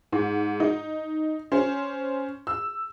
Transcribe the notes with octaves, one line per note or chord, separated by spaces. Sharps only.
G#2
D#4
C#4 C5
E6